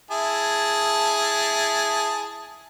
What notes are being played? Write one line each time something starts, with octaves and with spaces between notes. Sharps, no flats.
E4 G#4 A5